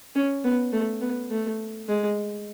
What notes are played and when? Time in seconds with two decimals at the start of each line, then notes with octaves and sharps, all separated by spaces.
0.15 C#4
0.44 B3
0.73 A3
1.01 B3
1.31 A3
1.88 G#3